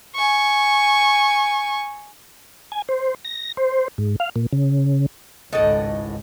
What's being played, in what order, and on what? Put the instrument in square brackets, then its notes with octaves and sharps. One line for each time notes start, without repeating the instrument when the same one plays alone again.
[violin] G#5 C#6
[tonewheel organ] G#5
C5
A#6
C5
G#2
F5
A#2
C#3
[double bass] G#1 C#2 [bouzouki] A2 D#5 F#5 [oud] D#4 A4